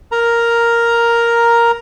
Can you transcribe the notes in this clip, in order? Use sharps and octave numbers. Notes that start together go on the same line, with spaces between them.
A#4 A#5